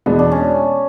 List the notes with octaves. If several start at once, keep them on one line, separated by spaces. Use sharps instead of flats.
E2 B2 G#3 B3 D4
D4
C#4